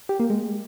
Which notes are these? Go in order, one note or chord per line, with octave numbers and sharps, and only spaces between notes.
G4
A#3
G#3